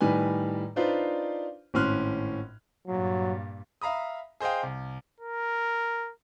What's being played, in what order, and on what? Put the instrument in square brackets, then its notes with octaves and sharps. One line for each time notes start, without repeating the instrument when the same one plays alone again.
[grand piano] A2 D#3 G3 B4 G#5
D4 D#4 F4 B4 C5 D5
G#1 A2 C#4 C6 F6 F#6
[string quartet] G2 A#2 [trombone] F#3
[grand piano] E5 F5 A#5 B5 D#6
G#4 C5 D#5 F5 G5
C2
[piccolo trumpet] A#4